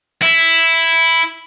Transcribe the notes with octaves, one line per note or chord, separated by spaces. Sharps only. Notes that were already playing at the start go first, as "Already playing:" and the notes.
E4